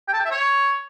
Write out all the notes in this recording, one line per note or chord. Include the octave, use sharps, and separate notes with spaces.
G5
A5
G5
E5
C#5